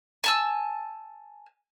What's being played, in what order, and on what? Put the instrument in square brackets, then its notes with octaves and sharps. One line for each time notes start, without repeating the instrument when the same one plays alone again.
[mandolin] G#5 A5 E6